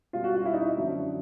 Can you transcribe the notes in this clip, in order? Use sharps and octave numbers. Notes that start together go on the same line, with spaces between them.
B2 G3 F4
F#4
F4
E4
D#4
E4
F#2 D3 F3